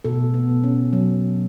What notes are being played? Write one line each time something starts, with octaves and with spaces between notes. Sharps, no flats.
B2 A4
B3
B2
C#4
F#3